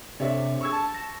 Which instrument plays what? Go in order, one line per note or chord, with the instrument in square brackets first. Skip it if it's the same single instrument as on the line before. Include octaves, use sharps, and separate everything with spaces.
[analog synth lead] C3 [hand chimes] D4 G4 A4 [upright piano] C#5 D5 E5
[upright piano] C#6 E6 G#6
[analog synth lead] A5
[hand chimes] A#6